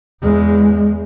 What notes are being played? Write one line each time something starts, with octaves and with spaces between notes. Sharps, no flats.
E2 G#3